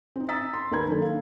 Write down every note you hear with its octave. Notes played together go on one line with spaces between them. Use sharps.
C4 D#4
A#5 D#6 E6 A6 B6
C6
D#2 D#3 B4 A#5 B5 G#6
F#1 D#3 D4 A4
F5